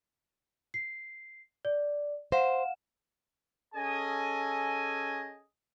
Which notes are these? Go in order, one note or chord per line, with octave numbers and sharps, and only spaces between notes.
C7
D5
C5 F5 F#5 E7
C#4 G#4 A4 D#5 G#5